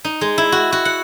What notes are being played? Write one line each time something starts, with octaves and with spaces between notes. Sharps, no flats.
D#4
G#3
E4
F#4
F#4
F#5